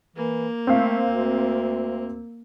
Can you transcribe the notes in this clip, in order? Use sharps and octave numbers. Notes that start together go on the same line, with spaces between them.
E3 A#3
A3 C4 F5
D2